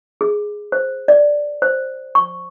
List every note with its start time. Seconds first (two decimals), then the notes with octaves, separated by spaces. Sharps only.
0.21 G#4
0.72 C5
1.08 D5
1.62 C5
2.15 C#6